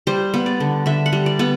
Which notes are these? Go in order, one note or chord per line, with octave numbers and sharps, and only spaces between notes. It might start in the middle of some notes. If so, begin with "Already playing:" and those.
G3 C5
B3
D5
D3
D3 E5
F#5
G3
D5
B3